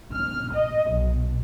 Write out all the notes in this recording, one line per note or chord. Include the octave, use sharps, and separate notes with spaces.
F6
D#5
B1